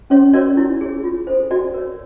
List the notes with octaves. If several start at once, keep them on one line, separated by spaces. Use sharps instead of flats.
C#4 C#5
F#4 A#4 C#5 D5
E4
G#4 C#5
F4
A4 C5
F#4 D5
A#4 C#5